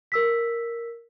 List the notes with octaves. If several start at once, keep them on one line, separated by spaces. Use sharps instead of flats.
A#4 E6 B6